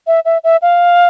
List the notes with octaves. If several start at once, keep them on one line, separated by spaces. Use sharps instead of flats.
E5
E5
E5
F5